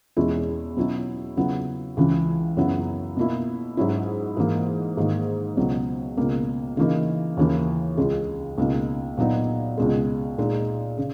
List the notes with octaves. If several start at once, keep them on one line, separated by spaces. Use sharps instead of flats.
E2 B2 G#3 C#4 E4
B2 F#3 C#4 E4
C#3 F#3 B3 E4
C#2 C#3 E3
F#2 C#3 F#3 B3 E4
B2 A#3 E4
G#2 F#3 C#4 E4
G#2 E3 A#3
G#2 D#3 A#3
C#2 B2 F#3
C#2 B2 A#3
C#3 E3 A#3 D#4
D#2 C#3 E3 A#3
C#2 C#3 G#3
C#2 B2 A#3 D#4
A#2 F#3 B3 D#4
C#2 B2 G#3
A#2 G#3 D#4
C#3